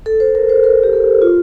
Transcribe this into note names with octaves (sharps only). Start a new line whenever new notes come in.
A4
C5
A#4
C5
A#4
G4
A4
F4